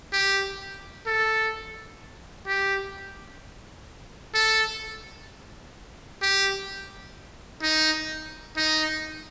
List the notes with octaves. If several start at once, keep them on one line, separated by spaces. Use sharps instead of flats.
G4
A4
G4
A4
G4
D#4
D#4